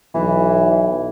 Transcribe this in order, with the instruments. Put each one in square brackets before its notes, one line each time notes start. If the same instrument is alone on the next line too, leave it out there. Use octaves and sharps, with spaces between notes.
[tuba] B1 [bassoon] E3